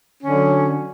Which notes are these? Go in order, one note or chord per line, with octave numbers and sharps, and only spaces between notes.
D3 F#3 C#4